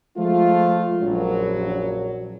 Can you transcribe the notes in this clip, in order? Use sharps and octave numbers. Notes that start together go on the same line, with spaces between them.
F3 G#3 A3 F4
A#1 F#2 F#3